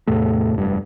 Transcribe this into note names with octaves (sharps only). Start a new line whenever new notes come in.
E2 A2 C3 A3
F1 G2